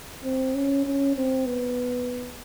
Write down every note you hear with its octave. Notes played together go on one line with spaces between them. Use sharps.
C4
C#4
C#4
C4
B3